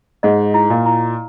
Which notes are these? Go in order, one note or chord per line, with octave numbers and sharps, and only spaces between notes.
G#2 D#5
E4
A#2
E4